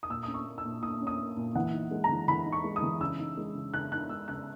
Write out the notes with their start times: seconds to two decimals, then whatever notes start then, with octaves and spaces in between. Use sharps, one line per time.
0.03 D#6
0.10 A#2 E6
0.23 C#4 D#6
0.34 C#6
0.46 A#3
0.58 E6
0.65 A#2
0.82 A#2 D#6
1.01 C#4
1.07 D#6
1.19 A#3
1.37 A#2
1.55 E3 F#5
1.74 D#4
1.91 G#3
2.04 A#5
2.09 E3
2.28 E3 B5
2.46 D#4
2.52 C#6
2.64 G#3
2.76 D#6
2.82 E3
3.01 C#3 E6
3.19 D#4
3.37 G#3
3.55 C#3
3.74 C#3 F#6
3.92 D#4 F#6
4.09 G#3 E6
4.28 C#3 F#6